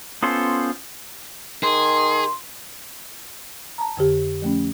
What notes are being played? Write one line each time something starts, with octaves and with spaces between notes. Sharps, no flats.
B3 C#4 F4 A4 C5
D#3 G#4 C6
A5 A#5
F2 D3 G4
F3 A3 C#4